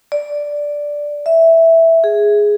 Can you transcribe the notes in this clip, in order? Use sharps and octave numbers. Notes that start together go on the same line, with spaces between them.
D5
E5
G#4